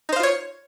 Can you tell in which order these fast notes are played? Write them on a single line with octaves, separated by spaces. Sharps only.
D#4 C5 F5 F4 C#5